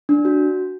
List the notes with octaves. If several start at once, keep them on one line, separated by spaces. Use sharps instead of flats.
D4
F#4